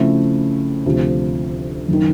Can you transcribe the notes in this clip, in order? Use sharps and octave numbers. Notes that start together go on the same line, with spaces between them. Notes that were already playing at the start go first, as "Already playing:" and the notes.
Already playing: C#3 F3 A3 C4 E4
D2 C3 F3
F#1
D#3